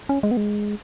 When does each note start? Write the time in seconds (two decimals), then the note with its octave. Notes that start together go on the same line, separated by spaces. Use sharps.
0.09 C#4
0.23 G#3
0.31 B3
0.37 G#3